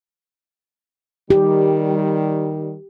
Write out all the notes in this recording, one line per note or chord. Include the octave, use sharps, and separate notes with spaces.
D#3 G3 G4